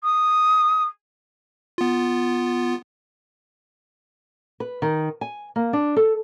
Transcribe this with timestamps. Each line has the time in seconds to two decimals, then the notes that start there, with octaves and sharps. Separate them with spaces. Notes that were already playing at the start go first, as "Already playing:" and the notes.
0.04 D#6
1.78 B3 F4
4.60 B4
4.82 D#3
5.21 G#5
5.56 A#3
5.73 D4
5.97 A4